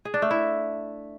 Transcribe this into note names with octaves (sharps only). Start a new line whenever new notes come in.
G#4
D4
A3
E4